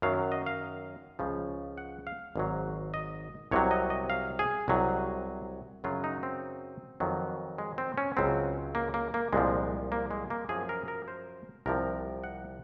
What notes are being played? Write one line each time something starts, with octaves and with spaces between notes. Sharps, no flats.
F#2 D#3 F#3 F5
D#5
F5
C#2 C#3 F3
F#5
F5
G#1 G#2 F#3
D#5
C2 C3 F#3 C#5
D#5
D#5
F5
G#4
C2 C3 F#3
F#2 C#3 F#3 F4
D#4
C4
F2 D#3 F#3
G#3
C4
C#4
C#2 C#3 F#3 C4
A#3
A#3
A#3
C2 A#2 F3 G#3
A#3
G#3
A#3
F#2 F3 G#4
A#4
A#4
C5
C2 C3 F3 A#4
F#5